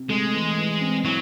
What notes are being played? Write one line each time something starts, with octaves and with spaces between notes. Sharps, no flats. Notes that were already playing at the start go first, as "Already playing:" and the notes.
Already playing: C3
G#3 A3
E3
E3
C4
F#3 E4